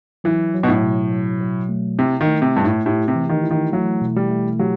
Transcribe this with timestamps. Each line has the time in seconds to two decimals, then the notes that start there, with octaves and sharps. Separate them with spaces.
0.24 E3 F#3
0.54 F#3
0.63 B2
0.68 A2
0.83 B2
1.12 F#3
1.40 F#3
1.69 A3
1.99 C3 E4
2.21 D#3
2.27 A3
2.42 C3
2.56 G2 E4
2.64 A2
2.86 A2 G4
3.08 C3
3.15 E3
3.29 D#3
3.44 E4
3.51 D#3
3.73 F#3 A3
4.01 B2
4.16 G3
4.31 A3
4.59 F#3 G4